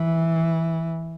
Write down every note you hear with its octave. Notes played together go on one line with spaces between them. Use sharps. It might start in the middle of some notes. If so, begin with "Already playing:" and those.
Already playing: E3